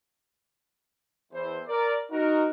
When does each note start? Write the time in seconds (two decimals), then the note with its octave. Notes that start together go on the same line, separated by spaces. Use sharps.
1.32 E2 E3 C5
1.67 A#4 D5
2.11 D#4 F#4 A#4